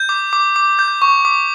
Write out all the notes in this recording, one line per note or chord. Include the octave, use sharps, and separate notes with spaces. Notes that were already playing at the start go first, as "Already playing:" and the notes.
Already playing: G6
D6
D6
D6
G6
C#6
D6